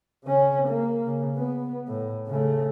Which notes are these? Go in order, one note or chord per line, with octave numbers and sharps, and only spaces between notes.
C#3 C#4
A#3
C#3
B3
A2
C#3 A3